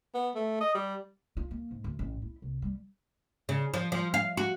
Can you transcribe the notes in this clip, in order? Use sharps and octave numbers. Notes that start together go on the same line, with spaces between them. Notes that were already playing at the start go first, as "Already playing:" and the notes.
B3
A3
D#5
G3
F4
A#3
G#2
D2
A1
E4
C2
G3
C#3
F3
F3
F5
F#4